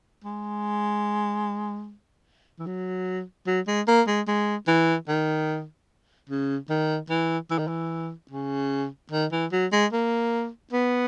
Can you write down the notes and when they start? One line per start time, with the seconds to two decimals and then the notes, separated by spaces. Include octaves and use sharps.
0.24 G#3
2.59 E3
2.66 F#3
3.47 F#3
3.67 G#3
3.88 A#3
4.07 G#3
4.28 G#3
4.68 E3
5.08 D#3
6.29 C#3
6.70 D#3
7.10 E3
7.51 E3
7.59 D#3
7.67 E3
8.31 C#3
9.12 D#3
9.32 E3
9.52 F#3
9.72 G#3
9.93 A#3
10.73 B3